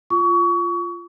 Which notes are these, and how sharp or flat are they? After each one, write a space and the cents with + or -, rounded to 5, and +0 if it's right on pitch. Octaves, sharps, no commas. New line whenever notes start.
F4 -10 C#6 +30